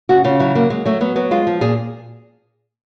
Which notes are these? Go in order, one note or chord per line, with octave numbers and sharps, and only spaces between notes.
C#3 F#4
C#3 F4
F#3 E4
F#3 A#3
F#3 G#3
F#3 A3
F#3 B3
F#3 B3
G#3 F4
F3
A#2 G#4